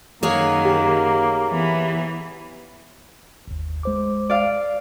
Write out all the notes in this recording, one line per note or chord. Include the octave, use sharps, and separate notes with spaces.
F#2 D#3 A#3 G#4 C#5 F#5
G4
E3 B3
G1 D#2
G#3 C5 D6
D5 F5